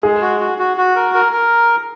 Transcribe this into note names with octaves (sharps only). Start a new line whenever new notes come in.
G#3 G#4
F#4
F#4
F#4
F#4
A#4
A#4
A#4